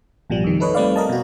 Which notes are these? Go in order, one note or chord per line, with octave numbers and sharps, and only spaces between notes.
A1 B2 F3 G3
F2 D#3
D#4 A4 B4 C#5 D#5
G3 A3 C4 B4 D5 F5
A#4 D#5 A5
B2 F#4